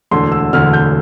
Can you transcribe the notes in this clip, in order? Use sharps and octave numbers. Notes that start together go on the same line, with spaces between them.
E1 D2 D3 C6
E6
E1 D2 D3 F6
G6